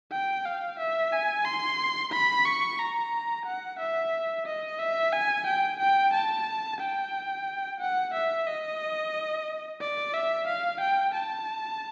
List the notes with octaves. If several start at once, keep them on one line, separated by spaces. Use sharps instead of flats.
G5
F5
E5
G#5
C6
B5
C#6
A#5
F#5
E5
D#5
E5
G#5
G5
G5
A5
G5
F#5
E5
D#5
D5
E5
F5
G5
A5